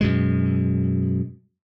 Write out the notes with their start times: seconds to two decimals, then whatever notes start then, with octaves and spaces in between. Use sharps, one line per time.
0.01 F#2 B2 G#3